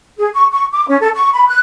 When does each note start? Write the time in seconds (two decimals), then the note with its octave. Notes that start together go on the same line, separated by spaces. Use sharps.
0.18 G#4
0.34 C#6
0.51 C#6
0.72 D6
0.88 C#4
1.01 A4
1.14 C#6
1.33 B5
1.47 F#6